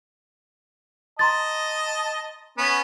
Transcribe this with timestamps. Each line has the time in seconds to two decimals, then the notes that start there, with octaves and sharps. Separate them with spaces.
1.19 D#5 A5 A#5 C6 A6
2.58 B3 C#4